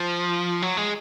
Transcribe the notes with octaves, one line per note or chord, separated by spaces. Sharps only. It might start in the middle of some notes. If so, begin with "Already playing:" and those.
Already playing: F3
F#3
G#3